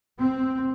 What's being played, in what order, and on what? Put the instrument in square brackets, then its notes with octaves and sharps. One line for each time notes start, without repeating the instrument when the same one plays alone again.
[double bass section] C4